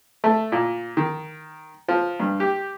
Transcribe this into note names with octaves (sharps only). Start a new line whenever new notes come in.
A3
A#2
D#3
F3
G2
G4